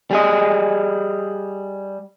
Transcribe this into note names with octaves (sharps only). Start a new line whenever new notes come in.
G3 G#4 D#5